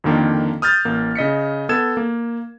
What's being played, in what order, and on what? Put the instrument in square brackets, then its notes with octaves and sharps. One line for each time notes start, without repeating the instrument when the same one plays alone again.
[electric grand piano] F2 D3 D#3 A#3 G5
D#6 F6 G6 A6
A1 A#3
C#3 D#5 B6 C#7
B3 A4 G#6 E7
A#3